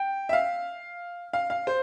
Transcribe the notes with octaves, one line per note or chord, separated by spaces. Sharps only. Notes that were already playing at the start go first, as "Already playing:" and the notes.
Already playing: G5
E5
F5
F5
F5
C5